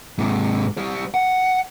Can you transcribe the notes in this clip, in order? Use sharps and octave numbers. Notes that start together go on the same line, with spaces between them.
G#2 C3
G3 C5
F#5